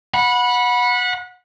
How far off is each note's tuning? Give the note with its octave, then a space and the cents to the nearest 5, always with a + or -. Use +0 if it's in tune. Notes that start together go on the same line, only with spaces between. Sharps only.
F#5 -25 B5 -15